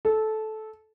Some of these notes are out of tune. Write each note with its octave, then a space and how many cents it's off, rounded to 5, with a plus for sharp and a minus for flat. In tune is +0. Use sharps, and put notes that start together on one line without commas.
A4 -15